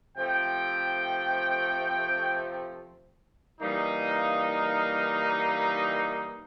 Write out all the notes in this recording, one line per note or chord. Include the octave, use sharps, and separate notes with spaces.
C3 F3 A3 G5
E3 G3 A#3 D#4
F5